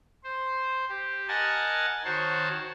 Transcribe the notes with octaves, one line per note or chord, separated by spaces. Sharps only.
C5
G4
A#4 D#5 F#5 G#5 A5 A6
D#3 F#4 C5 C#5 A5